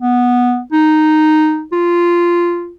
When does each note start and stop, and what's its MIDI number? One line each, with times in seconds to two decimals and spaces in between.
0.01 0.60 59
0.72 1.63 63
1.72 2.73 65